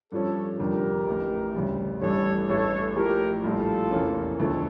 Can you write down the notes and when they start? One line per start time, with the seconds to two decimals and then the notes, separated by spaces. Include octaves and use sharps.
0.12 G2 F3 C#4 A4 C#5
0.59 F1 F2 D3 G3 G4 A#4
1.07 A1 A2 E3
1.55 D2 C#3 G3
2.01 A1 G2 E3 G3 A4 C#5
2.48 A1 G2 E3 A3 A4 C#5
2.96 A2 F3 A3 G4 A#4
3.43 A#1 A2 G3 F4 A4
3.91 F1 E2 E3 A#3 C#4
4.38 E1 D2 D3 F3 A4 C#5